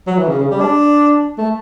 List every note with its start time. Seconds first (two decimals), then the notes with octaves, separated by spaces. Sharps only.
0.07 F#3
0.18 E3
0.28 C#3
0.39 C#3
0.51 G3
0.61 D4
1.38 A3